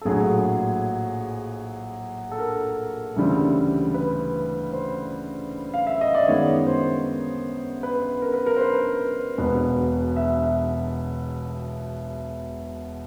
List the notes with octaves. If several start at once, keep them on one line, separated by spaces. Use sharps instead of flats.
A4
A#1 A2 F#3 G#4
A4
A#4
D2 C#3 E3 G3 C4
B4
C5
F5
E5
D#5
D5
F#2 D#3 G#3 B3 C#5
C5
B4
A#4
B4
A#4
C5
B4
E1 E2 B2 B4
E5